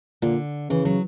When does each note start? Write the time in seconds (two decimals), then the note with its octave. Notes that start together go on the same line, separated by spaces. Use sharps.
0.22 A#2 D3
0.70 C#3 E3
0.85 F#3